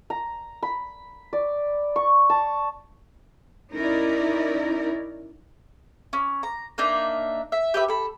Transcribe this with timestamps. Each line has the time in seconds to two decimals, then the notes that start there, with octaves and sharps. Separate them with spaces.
0.10 A#5
0.63 B5
1.33 D5
1.96 C#6
2.30 A5
3.73 C#4 D#4 E4 A#4 D5
6.13 C#4
6.43 A#5
6.78 A#3 D4 D#4 E5
7.52 E5
7.74 G4 B4 E5
7.88 A4 B5